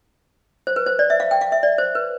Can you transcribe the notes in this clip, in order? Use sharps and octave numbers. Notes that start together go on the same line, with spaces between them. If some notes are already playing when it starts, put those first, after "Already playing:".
C5
B4
C5
D5
E5
F5
G5
F5
E5
D5
C5
B4